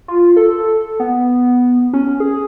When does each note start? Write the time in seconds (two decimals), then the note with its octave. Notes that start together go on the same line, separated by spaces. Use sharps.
0.08 F4
0.37 A4
1.00 B3
1.93 C#4
2.20 G#4